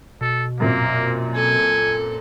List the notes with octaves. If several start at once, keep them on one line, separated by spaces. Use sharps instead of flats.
B2 A4
F#2 A#2 A#3 C4
A4 G#5